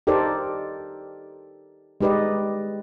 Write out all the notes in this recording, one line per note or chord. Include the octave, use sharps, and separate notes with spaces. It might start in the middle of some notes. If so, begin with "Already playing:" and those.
D#4 G4 A4 A#4 C5 D5
G#3 D#4 G4 B4 D5 D#5